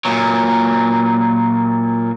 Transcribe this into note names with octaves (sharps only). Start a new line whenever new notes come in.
A#2 F#3